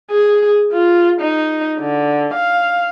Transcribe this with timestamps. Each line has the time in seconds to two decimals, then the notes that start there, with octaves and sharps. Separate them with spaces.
0.10 G#4
0.72 F4
1.21 D#4
1.79 D3
2.34 F5